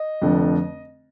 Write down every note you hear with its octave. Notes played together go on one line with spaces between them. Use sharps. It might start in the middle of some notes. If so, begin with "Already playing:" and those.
Already playing: D#5
F1 F2 D3